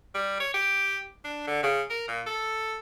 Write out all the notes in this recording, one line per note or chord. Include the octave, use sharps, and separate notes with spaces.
G3
C#5
G4
D4
D3
C#3
A#4
A#2
A4